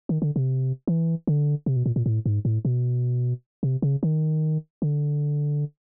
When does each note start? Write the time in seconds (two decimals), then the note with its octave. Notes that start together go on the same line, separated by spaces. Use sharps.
0.09 D#3
0.22 D3
0.36 C3
0.87 E3
1.27 D3
1.66 C3
1.76 B2
1.86 A#2
1.96 A#2
2.06 A2
2.26 G#2
2.45 A2
2.65 B2
3.63 C3
3.82 C#3
4.03 D#3
4.82 D3